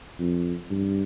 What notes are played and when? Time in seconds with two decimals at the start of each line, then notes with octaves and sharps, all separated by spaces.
0.19 F2
0.70 G2